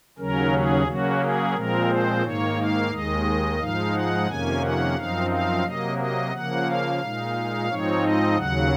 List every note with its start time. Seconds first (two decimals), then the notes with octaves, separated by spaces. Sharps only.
0.18 D#2 C#3 F#3 C#4 A#4
0.52 G#4
0.86 C#3 F#3 A#3 C#4 F#4
1.21 G#4
1.55 A#2 F3 G#3 C4 A#4
1.88 C5
2.23 G#2 D#3 A#3 C#5
2.57 F5
2.91 D#2 D#3 G#3 D#5
3.59 G#2 F3 G#3 D#4 F5
3.93 F#5
4.27 F2 C3 D#3 A#3 C#4 G#5
4.61 F#5
4.95 F#2 F3 C4 D#4 F5
5.30 F5
5.63 C3 F#3 A#3 D#5
5.98 D#5
6.32 C#3 F3 A#3 F#5
6.67 F5
7.00 A#2 G#3 D#4
7.68 G#2 F3 C4 D#4 C#5
8.02 D#5
8.36 D#2 C#3 F#3 F#5